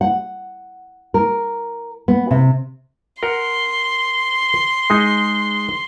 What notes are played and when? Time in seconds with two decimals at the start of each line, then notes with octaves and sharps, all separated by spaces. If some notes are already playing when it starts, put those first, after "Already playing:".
0.01 F#5
1.14 A#4
2.08 B3
2.31 C3
3.23 A#4 F#5 C6
4.90 G#3 D#4